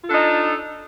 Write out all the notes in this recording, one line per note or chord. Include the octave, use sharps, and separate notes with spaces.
D4 D#4 F4 A4